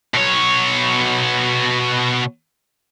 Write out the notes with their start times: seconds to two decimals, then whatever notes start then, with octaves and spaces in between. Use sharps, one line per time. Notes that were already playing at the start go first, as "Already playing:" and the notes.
0.14 B2 C#5